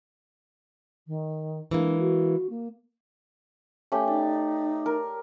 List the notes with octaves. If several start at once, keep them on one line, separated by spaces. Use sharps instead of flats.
D#3
E3 G#3 A#3 D4
F#4
A#3
A3 C#4 G4
D#4 D5
A#4